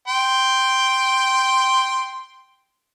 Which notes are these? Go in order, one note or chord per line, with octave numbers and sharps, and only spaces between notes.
G5 C6